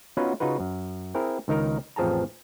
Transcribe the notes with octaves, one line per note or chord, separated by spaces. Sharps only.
B3 C#4 D#4 F4 F#4 B4
C#3 D#4 F4 F#4 B4
F#2
C4 E4 G#4 A#4
C#2 D#3 D#4 A#4
A1 F2 F3 G#4 A5 A#5